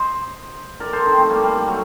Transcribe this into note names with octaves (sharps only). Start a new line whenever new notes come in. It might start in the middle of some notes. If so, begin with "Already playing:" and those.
Already playing: C5 D#5
A#4 D5
A4 C5
C4 D#4
A3 C4
G3 A#3
G3
G3
F#3 A3